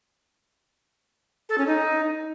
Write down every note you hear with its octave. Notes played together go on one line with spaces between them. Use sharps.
A4
C#4
D#4